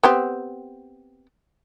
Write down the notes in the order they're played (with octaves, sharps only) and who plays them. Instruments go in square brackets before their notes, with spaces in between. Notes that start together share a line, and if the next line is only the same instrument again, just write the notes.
[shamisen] B3 C4 G4